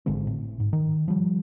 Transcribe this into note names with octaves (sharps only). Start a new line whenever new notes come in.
G#1 D3 G#3 C4
A2
G#2
D#3
F3 G3